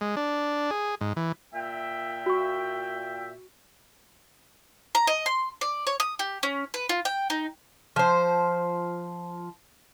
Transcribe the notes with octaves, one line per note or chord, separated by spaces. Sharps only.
G#3
D4
G#4
G#2
E3
A#2 E5 G5
F#4 C#6
A#5
D#5
C6
D5
C#5
D#6
G4
C#4
B4
F4
G5
D#4
F3 C5